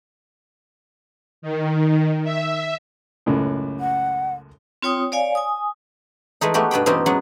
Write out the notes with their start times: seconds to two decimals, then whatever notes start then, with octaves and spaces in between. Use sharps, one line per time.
1.42 D#3
2.24 E5
3.26 C#2 F#2 A2
3.80 F#5
4.82 C4 F4 C#5 G5 D#6
5.12 C#5 D5 F5 G#5
5.35 G#5 D#6
6.41 E3 G#3 A3 D#4
6.54 A3 B3 F#4 G4
6.71 G2 B2 B4 G5
6.86 B2 E3 C4 C#4 D#4 G4
7.06 F#2 F#3 G#3 B3 F#5